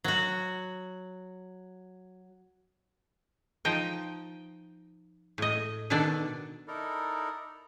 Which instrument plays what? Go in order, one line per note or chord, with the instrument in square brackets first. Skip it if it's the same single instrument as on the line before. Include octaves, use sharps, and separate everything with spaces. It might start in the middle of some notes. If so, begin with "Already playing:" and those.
[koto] F#3 F#4
F3 D#4 D#5 G5
A2 D#5
B2 D#3 D4 A4 D5
[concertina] D#4 E4 A4 A#4 D5